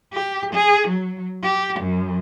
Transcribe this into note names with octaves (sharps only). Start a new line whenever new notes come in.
G4
G#4
F#3
G4
F#2